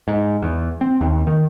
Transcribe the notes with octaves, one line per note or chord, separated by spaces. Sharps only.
G#2
E2
C4
D#2
D#3